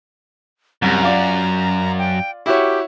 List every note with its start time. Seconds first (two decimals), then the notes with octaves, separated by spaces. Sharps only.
0.82 C2 F#2 A#5
1.02 F4 D5
1.99 G5
2.46 E4 F#4 G4 C#5